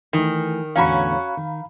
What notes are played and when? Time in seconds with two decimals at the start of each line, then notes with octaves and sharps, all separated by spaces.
0.13 D#3 E3 A3
0.76 E2 A2 D3 C#4 F#4 F5 A#5 B5
1.37 D#3